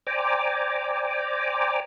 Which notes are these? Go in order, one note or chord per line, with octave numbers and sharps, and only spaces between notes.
C5 D5 G5 G#5 A#5 D6